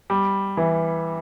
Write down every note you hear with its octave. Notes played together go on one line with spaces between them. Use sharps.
G3
E3